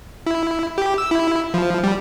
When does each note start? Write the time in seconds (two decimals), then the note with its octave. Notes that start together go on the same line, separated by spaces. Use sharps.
0.27 E4
0.78 G4
0.98 E6
1.11 E4
1.54 F3
1.84 G3